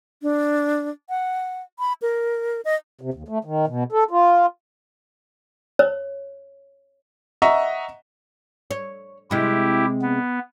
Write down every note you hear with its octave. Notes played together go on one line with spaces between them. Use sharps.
D4
F#5
B5
A#4
D#5
C3
D#2
A3
D#3
B2
A4
F4
C#5
D#5 E5 F#5 A#5 C#6
C#5
C3 G#3 E4 G4
B3